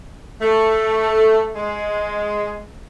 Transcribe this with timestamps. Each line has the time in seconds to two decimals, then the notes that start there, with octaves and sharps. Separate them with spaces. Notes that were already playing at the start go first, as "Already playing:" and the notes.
0.41 A3
1.55 G#3